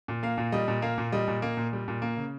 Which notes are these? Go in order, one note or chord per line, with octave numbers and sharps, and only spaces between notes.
A#2
A#3 F5
A#2
G3 D#5
A#2
A#3 F5
A#2
G3 D#5
A#2
A#3
A#2
G3
A#2
A#3
C#3